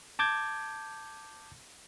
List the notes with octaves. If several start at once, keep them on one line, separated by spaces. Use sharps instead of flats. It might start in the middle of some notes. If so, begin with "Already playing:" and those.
A5 D6 G6 G#6